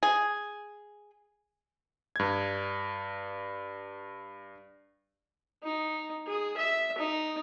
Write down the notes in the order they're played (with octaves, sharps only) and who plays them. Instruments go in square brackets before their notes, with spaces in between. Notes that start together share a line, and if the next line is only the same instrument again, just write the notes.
[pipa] G#4
[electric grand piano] G2 G#6
[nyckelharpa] D#4
G#4
E5
D#4